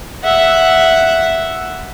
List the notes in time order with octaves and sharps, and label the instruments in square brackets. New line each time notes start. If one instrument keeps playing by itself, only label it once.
[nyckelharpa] E5 F#5